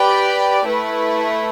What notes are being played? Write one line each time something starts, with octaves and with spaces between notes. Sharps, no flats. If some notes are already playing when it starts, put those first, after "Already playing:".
Already playing: G4 B4 D5 G5
A3 E4 B4